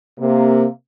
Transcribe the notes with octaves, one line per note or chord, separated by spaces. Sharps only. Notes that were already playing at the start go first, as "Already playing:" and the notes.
C3 A#3